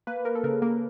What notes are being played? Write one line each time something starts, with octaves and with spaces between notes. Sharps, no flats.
A#3 B4
A#3 A#4
A4
C#3 A#4
A#3 A#4